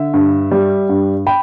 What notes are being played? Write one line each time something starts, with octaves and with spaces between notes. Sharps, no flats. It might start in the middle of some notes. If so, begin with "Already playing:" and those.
Already playing: D3 E5
G2
G3
G2
G5 B5